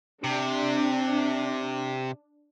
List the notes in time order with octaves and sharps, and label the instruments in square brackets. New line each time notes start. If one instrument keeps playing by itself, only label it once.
[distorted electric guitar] C3 [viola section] D4